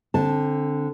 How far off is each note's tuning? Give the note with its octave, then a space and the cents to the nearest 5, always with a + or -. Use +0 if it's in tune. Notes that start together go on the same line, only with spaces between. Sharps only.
D3 +0 C4 +20 A5 +0